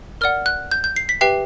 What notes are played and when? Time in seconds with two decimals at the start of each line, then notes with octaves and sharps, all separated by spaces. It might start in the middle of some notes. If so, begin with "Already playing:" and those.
0.21 A#4 D5 F#5 F6
0.46 F#6
0.71 G6
0.84 G6
0.96 C7
1.09 B6
1.21 G4 B4 E5 G5 C7